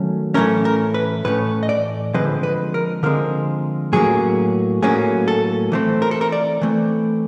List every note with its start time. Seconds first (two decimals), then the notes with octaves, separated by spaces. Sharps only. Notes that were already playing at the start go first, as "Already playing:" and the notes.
Already playing: D#3 F#3 A3 C#4
0.34 A2 E3 A3 C#4 A#4
0.65 A#4
0.94 B4
1.25 A2 E3 A3 C#4 B4
1.63 D#5
1.69 D5
2.14 D3 F3 G#3 C4 B4
2.43 B4
2.74 A#4
3.03 D3 F3 G#3 C4 A#4
3.93 A2 F#3 A#3 C#4 G#4
4.82 A2 F#3 A#3 C#4 G#4
5.28 A4
5.72 E3 A3 C4
6.02 A#4
6.11 A4
6.21 A#4
6.32 D5
6.62 E3 A3 C4